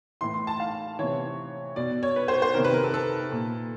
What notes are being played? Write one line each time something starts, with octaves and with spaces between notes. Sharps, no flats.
A2 E3 C6
C6
A5
F5
C3 E3 C#5
B2 D5
C#5
B4
C5
C5
C3 D#3 A#4
B4
A#4
A4
A4
A#2